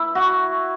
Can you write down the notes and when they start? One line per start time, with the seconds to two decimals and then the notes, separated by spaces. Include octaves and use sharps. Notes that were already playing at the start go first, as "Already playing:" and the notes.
Already playing: E4
0.15 F#4